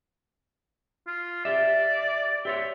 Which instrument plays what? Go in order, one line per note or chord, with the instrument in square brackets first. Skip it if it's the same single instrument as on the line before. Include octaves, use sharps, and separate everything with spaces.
[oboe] F4
[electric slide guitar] G4 E5 [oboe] D5
[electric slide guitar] G4 C5 C#5 [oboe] E5